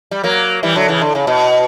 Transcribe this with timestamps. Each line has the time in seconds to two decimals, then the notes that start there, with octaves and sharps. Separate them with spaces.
0.11 G3
0.23 F#3 A#3
0.63 E3 G3
0.75 D3 F#3
0.88 C#3 E3
1.01 D3
1.15 C#3
1.27 B2